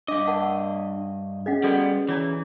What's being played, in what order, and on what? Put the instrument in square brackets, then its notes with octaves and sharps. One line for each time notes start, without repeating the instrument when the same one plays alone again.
[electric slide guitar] G2 D#5 [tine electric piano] D4 [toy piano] F5 D6
[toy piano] A#4 F#5 A5
[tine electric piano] C#4 G#4 [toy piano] D#5 F5 F#5
[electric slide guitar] G3 B3 [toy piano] F#4 A4 D5
[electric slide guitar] E3 [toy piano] C#5 D5 A#5